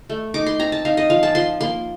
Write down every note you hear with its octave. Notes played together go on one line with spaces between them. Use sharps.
A3
D#4 D6
C6
C4 A#5
A5
D#4 F5
D#5
F3 F5
A5
F3 C6
A#3 C6